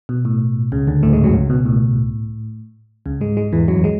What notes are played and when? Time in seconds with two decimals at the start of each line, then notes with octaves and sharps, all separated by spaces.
0.09 B2
0.25 A2
0.72 C#2 C#3
0.87 D2 D3
1.03 A2 A3
1.13 G#2 G#3
1.23 F#2 F#3
1.34 C#2 C#3
1.50 B2
1.65 A2
3.06 C#2 C#3
3.21 G#2 G#3
3.37 G#2 G#3
3.53 E2 E3
3.68 F#2 F#3
3.84 G#3